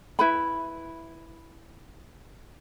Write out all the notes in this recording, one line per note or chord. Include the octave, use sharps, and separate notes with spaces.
E4 B4 B5